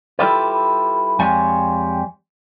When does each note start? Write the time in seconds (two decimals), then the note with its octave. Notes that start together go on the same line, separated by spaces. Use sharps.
0.19 G3 E4 F4 G4 A4 B4
1.19 F2 G3 G#3 C#5 G#5